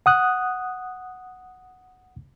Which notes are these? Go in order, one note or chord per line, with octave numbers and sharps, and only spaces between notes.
F#5 D#6 F#6